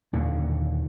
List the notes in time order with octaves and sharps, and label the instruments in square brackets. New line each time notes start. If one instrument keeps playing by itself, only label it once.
[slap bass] D#2 A#2 D3